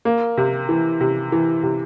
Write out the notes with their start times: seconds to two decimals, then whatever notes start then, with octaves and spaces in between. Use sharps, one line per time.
0.05 A#3
0.37 C3
0.69 E3
1.01 C3
1.32 E3
1.63 C3